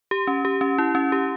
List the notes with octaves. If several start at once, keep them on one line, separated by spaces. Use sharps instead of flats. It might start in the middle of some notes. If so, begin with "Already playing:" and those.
G4
C#4
G4
C#4
E4
C#4
G4